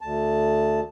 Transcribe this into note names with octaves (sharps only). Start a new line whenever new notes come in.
D2 A5